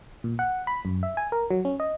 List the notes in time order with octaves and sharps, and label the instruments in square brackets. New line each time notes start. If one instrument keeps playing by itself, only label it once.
[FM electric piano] A#2
F#5
B5
F#2
E5
G#5
A#4
F#3
C#4
D#5